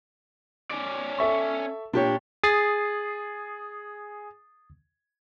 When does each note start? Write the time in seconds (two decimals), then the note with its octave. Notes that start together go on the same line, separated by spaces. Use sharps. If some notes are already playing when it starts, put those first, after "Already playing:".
0.71 C#4 D5
1.18 A4 E5 C#6
1.93 A#2 D4 G4 C#5
2.43 G#4 D#6 A6 C7